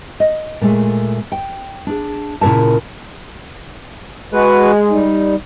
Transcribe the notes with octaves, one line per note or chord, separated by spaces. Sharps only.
D#5
A#2 G#3 A3
G5
D4 G#4
A#2 C#3 E4 A#4 A5
G#3 F#4 B4
G3 D#4